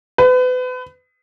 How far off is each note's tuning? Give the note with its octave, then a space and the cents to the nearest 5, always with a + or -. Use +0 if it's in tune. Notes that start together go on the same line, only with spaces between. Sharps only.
B4 +35